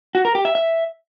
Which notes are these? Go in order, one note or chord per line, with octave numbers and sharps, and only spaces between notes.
F#4
A#4
G4
E5
E5